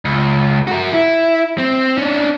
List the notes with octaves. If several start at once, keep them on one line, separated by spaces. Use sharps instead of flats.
C#2
F#4 A#4
E4
C4
C#4 D4